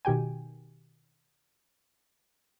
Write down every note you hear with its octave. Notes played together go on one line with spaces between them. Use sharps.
B2 D#3 G4 G5 G#5